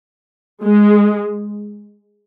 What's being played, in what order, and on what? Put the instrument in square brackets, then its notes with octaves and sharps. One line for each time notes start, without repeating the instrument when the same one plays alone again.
[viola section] G#3